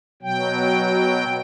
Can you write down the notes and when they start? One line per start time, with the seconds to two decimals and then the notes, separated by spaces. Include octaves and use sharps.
0.23 B2 F#3 G5